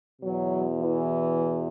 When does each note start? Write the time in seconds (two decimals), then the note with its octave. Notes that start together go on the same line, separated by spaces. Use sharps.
0.22 E2 B2 F#3
0.81 E3